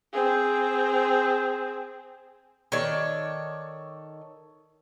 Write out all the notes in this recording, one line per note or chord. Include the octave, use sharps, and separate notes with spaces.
C4 G#4
D#3 A4 C#5 D5